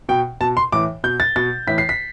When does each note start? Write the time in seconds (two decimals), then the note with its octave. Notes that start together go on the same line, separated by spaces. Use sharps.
0.09 B2 G5
0.41 B2 A5
0.57 C6
0.72 A2 E3 D6
1.04 B2 G6
1.20 A6
1.36 B2 A6
1.67 A2 E3 B6
1.78 C7
1.89 B6